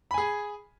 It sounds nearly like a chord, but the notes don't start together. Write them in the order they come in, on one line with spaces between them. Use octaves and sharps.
B5 G#5 G#4